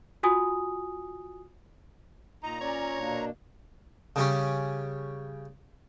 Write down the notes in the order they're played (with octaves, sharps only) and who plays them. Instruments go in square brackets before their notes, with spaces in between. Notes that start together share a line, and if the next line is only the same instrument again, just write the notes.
[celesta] F4 F#4 G#5 D#6
[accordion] A#2 A#5 [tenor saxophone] D#4
[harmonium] C#4 D5 [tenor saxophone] C#5
[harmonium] B2 A#3 D4
[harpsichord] C#3 G3 C#4